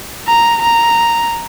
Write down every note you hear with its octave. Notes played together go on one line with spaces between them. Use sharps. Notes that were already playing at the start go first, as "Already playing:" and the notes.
A#5
A#5